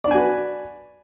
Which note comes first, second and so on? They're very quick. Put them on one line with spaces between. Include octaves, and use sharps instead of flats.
D5 D4 G#5 F#4 B4